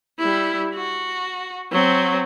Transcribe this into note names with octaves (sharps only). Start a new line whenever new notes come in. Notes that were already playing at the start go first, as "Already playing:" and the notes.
G3 E4
F#4
F#3 C4